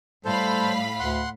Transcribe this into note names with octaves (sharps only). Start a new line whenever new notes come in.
A2 G3 A4 C5 F5 B5
D2 F#5 C6